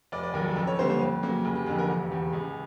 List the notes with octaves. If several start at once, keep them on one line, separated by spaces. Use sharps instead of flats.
F1 D5
D5
D#2 C#3 F#3 A#4
A4
F2 A4
C#5
D3 G3 A#3 C5
C5
F2 B4
C#3 F#3 A#3
F1 G#4
G4
F2 D3 G#4
A#4
E1 G4
E2 C#3 G4
C#2 G#4